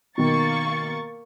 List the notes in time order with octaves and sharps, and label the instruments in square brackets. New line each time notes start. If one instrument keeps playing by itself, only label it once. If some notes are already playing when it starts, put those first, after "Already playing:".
[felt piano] B2 D#3 [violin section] A#3 C#6 A6